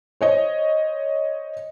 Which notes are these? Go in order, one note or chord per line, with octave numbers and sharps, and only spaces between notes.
C5 C#5 D#5